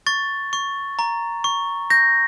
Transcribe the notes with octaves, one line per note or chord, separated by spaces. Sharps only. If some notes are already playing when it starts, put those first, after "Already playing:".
C#6 A6
C#6
A#5
C#6
G6 A#6